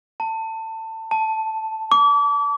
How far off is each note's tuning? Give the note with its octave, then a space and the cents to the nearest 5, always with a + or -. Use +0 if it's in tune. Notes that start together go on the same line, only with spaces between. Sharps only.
A5 +25
A5 +0
D6 -35